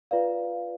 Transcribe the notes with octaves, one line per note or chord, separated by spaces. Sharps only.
F4 B4 D5 F5